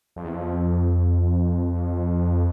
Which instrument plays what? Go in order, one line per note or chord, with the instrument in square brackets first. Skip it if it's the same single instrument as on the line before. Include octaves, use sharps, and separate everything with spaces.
[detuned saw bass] F2
E2
F2